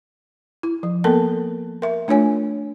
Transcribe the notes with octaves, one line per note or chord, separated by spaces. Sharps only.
E4
F3
A#3 B3 A4 A#4 A5
A#4 E5
A3 D4 F4 C#5 G#5